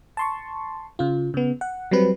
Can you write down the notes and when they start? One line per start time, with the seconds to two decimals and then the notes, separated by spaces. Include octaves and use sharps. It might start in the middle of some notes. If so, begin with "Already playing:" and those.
0.17 A5 C6 C#6
0.99 C#3 F4
1.34 C#3 B3
1.61 F#5
1.91 F#3 G3 C4 B4